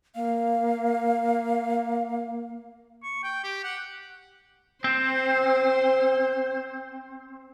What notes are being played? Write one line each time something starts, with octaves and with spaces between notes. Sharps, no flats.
A#3 F5
C#6
G5
G4
F#5
C4 C5